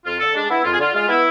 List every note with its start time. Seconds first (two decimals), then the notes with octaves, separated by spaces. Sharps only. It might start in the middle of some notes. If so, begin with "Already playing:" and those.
0.05 F2 F4
0.19 D3 A4
0.35 G#3 D4
0.50 B3 E4
0.64 F2 F4
0.74 G#4
0.79 D3 F4
0.94 G#3 F4
1.09 B3 E4